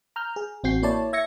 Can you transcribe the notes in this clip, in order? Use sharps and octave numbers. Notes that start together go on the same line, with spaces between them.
A#5 F6 G6
G#4
A1 C4 F#4 G6 C7
A#3 E4 C#5 D5 A5
E5 G#6 A#6 C#7